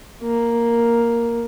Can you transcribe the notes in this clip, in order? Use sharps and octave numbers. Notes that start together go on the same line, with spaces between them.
A#3